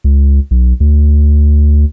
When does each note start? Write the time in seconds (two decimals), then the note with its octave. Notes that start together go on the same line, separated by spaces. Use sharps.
0.04 C#2
0.51 B1
0.80 D2